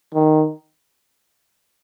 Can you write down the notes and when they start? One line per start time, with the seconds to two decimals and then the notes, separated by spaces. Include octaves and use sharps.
0.15 D#3